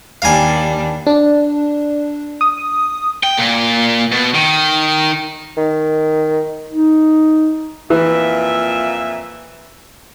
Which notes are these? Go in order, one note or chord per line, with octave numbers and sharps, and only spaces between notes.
D#2 G3 D4 F5 G#5
D4
D#6
G5
A#2
B2
D#3
D#3
D#4
F2 A#2 E3 E5